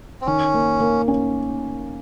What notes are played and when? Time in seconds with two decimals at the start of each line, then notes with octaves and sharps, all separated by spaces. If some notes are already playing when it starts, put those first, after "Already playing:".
0.21 C4
0.26 D#3 C#4
0.54 A#3
0.80 A#3
1.08 C#4